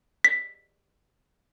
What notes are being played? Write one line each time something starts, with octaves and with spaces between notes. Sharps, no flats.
B6